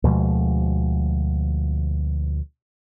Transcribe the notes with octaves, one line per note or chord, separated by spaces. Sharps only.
D2 B2 F3 G#3